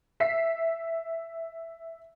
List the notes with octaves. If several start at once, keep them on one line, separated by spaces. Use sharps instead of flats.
E5 B6 C7